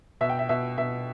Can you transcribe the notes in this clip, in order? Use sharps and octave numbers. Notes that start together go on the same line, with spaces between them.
B2 E5
G5
E5
B2 E5
B2 E5